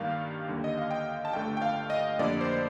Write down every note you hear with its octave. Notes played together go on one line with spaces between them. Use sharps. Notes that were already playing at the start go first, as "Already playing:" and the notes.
Already playing: G2 D#3 G3 A#3 F5
D#2 D3 G3 A#3
D#5
F5
G5
A5
G1 G2 D3 A3 G5
G5
F5
D#5
F2 D3 G3 A#3 D5
C5
C5